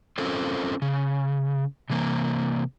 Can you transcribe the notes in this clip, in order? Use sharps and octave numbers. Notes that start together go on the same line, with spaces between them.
C4 C#4 F4 A4 A#4 C5
C#3
C3 E3 A#3